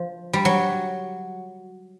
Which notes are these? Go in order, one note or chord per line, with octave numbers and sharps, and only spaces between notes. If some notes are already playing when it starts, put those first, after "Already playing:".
Already playing: F3
G3
F#3